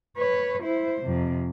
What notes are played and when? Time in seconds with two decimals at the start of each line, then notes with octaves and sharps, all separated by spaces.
0.17 B4 C#5
0.63 E4 C5
1.02 F2 C3